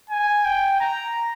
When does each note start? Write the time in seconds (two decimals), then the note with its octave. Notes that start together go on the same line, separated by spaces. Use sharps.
0.09 G#5
0.45 G5
0.80 A#5